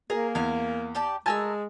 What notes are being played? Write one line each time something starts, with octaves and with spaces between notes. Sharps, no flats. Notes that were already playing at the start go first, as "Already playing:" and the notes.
A#3 G#4 A#4
E2 F5 G#5
G4 D5 A5
G#3 A3 A#4 G#5 A5 E6